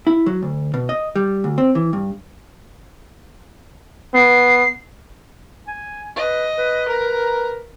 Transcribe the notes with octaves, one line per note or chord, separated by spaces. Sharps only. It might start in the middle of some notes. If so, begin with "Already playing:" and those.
E4
F#3
D2
B2
D#5
G3
D2
C4
E3
G2
B3 C7
G#5
B4 D#5
B4
A#4 A#5